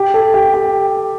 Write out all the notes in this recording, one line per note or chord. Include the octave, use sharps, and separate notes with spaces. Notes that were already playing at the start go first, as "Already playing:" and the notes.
Already playing: G4
A4
G4
G4